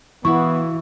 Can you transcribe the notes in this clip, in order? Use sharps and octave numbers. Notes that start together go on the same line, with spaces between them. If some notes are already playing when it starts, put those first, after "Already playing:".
E3 B3 E4 F#4 F5 C#6